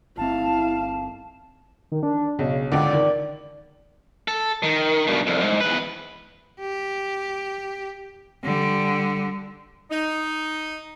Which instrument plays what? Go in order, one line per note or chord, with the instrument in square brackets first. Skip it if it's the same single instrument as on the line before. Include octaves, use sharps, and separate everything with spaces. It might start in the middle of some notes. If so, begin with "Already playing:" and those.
[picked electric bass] G1 C4 [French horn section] E4 [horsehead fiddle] F5 [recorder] A5
[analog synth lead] D#3
D4
[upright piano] B1 [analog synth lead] C#3
[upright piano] C#2 D3 [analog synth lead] D5
[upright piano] D#3
[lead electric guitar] A4
D#3
G2 B2
C2 F2
G#2
E2 B4
[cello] G4
D3 G3
[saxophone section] D#4